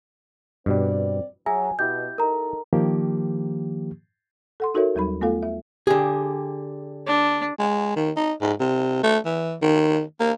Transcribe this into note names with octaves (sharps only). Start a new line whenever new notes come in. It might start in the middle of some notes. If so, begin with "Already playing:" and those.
G2 B2 G3 C4 D5
F#3 G#4 E5 G#5 A#5
B2 E4 G4 D#5 G6
D#4 A4 A#4 A#5
D#3 F3 A#3 G4
A4 F#5 C6
D#4 F#4 A4 A#4 C#5 E5
D#2 F#3 G3 D#4 B5
A3 B3 F4 A4 F5
E5
D3 G4 G#4
D4
G#3
D#3
D#4
G#2
C3
A3
E3
D#3
A#3